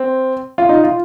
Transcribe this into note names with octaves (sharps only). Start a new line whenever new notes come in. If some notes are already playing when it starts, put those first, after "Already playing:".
Already playing: C4
F4
D#4
F4